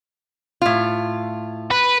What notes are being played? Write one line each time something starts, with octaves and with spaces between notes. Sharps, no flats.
A2 F4
B4